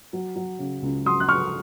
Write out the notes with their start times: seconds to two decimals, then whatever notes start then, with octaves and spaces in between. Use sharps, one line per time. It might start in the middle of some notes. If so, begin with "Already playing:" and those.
0.13 F#3
0.36 F#3
0.59 C#3
0.82 C#2
1.05 F#3 C6 D#6
1.20 F#6
1.29 F#3 C#6 F6